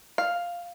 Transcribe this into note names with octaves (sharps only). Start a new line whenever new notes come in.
F5